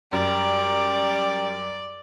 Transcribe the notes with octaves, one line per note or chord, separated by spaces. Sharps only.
F#2 G3 D5